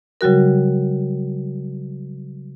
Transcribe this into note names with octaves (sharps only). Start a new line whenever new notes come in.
C#3 F#3 G3 F#4 A#4